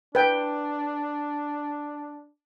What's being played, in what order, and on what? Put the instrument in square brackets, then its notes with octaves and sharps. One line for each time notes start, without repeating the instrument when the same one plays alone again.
[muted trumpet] D4 [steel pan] B4 G5